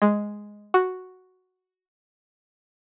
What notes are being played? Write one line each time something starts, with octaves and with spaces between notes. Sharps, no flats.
G#3
F#4